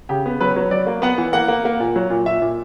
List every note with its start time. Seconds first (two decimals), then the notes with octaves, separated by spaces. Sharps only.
0.09 C#3 G4
0.26 B3
0.41 F#3 B4
0.56 F#3
0.71 F#3 D5
0.87 A#3
1.02 B3 F#5
1.18 E3
1.33 A#3 F#5
1.48 A#3
1.65 A#3
1.80 A#2
1.96 F#3
2.10 A#2
2.26 A#2 E5
2.42 A#2